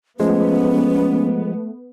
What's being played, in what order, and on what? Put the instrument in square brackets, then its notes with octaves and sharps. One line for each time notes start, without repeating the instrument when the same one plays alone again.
[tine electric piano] F3 G#3 [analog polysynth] A3 [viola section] B3 [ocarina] C#4